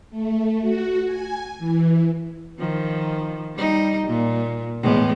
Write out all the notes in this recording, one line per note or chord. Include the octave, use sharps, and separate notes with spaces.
A3
F#4
G#5
E3
D#3 F3
G3 D#4
A#2
E2 A2 G#3